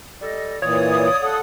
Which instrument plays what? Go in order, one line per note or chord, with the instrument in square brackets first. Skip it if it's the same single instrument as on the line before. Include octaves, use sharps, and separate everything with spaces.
[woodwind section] G3 A4 D#5
[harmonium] A#2 E3 [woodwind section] F4 D5 D#6 [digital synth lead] C#5
[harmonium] A4 F#5